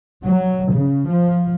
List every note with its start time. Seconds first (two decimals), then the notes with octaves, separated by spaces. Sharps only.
0.24 F#3
0.72 C#3
1.08 F3